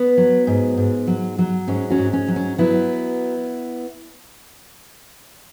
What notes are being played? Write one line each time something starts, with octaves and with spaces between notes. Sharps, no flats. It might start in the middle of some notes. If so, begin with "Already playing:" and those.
Already playing: B3
F#3
G#2
G#2
F#3
F#3
G#2 C#4
C#4 F#4
G#2
C#4
F#3
C#4
F#3 B3 E4